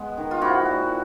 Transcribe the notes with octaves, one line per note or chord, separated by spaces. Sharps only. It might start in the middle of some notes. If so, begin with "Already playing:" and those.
Already playing: G#3 B3
D#3
F4
F3 E4 F#4
A#2